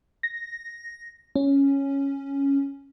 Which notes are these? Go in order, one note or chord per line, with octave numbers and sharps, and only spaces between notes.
A#6
C#4